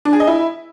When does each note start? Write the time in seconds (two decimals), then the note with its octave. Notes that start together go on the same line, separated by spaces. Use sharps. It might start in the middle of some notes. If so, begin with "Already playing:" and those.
0.05 D4
0.13 G#4
0.20 D#5
0.27 E4